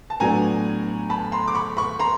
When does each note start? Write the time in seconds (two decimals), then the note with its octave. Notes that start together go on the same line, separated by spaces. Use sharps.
0.10 A5
0.20 A2 F#3 B3 D4 G#5 A#5
1.10 A5 B5
1.32 A#5 C6
1.48 D6
1.55 B5 C#6
1.77 B5 C#6
1.99 A#5 C6